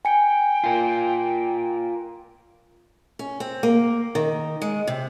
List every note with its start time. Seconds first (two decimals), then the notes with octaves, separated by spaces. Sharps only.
0.05 G5 G#5 C#7
0.64 F4 A#4
3.19 C#4
3.40 C4
3.63 A#3
4.15 D#3
4.62 G#3
4.87 C3